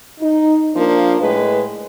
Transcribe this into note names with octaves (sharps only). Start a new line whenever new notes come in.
D#4
F3 A#3 D4
A2 G#3 B4